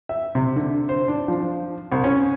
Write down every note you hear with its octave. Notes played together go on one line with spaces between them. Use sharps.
E5
C3
D3
C5
D4
F3
C2
C#4